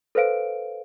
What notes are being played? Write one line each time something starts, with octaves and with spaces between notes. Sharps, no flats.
A4 B4 C5 F5 D7